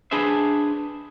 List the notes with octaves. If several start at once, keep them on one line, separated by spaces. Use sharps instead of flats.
D4 G#4 B4 C5 E5